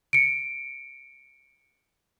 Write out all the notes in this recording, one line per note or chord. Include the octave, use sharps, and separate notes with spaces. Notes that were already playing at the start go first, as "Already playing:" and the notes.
C#7 D7